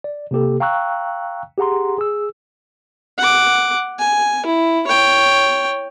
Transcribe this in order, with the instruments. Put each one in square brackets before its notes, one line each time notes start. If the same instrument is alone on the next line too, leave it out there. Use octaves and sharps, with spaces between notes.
[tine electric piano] D5
C3 A#3 G4 A4
F5 G5 A#5 C#6 E6 F#6
G4 G#4 F#5 A#5 C6
G#4 E6
[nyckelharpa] F#5 D6
G#5
E4
C#5 G5